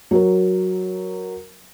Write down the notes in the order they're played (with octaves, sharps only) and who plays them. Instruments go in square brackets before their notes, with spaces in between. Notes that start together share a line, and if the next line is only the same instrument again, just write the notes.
[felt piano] F#3 A#4